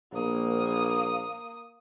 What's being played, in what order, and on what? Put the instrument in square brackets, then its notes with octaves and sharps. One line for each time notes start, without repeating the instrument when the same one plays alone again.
[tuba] A#1 [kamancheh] A#3 D#6